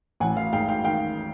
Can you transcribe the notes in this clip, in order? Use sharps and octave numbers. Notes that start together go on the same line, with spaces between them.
A1 F#5 G#5
F5
G#2 F5 G5
F5 G5
D#3 F5 G5